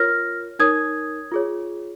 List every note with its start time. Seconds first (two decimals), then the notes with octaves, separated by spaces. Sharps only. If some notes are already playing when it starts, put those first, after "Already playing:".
Already playing: F4 A#4 C#5 F6 A#6
0.59 D#4 A#4 C#5 D#6 G#6
1.32 F4 G#4 C#5